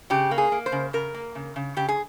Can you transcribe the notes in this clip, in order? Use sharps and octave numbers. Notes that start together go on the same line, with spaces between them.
C#3 G4
A#3
G#4
A#3
C5
C#3
C#3 A#4
A#3
C#3
C#3
C#3 G4
G#4